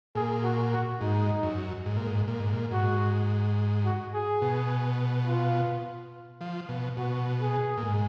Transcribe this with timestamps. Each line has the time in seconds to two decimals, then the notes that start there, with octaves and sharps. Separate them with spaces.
0.15 A#2 G#4
0.43 F#4
0.73 F#4
1.01 G#2 D#4
1.43 F#2
1.86 G#2
1.96 A#2
2.06 G#2
2.28 A#2
2.40 G#2
2.53 A#2
2.71 G#2 F#4
3.85 F#4
4.14 G#4
4.42 B2
5.27 F4
6.41 F3
6.69 B2
6.97 B2 F#4
7.40 G#4
7.77 A#2
7.82 G#2